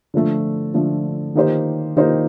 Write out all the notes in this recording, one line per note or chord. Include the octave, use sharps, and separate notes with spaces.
D3 F3 A3
D3 F3 A3
D#3 A#3 D#4 G4 C5
D#3 A#3 D#4 G4 C5